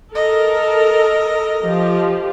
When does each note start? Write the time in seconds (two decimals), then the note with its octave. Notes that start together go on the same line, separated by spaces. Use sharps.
0.15 A4 A#4 D#5
1.63 F3 G4